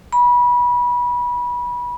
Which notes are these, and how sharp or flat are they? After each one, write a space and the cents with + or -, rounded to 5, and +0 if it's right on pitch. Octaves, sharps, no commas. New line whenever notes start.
B5 -25